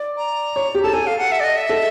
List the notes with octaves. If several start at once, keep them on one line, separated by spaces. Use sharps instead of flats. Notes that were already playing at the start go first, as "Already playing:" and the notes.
Already playing: D5
A#5
C#5
G4
A4 A5
A4 G#5
F5
F#5
E5
D5
D#5
E5
A4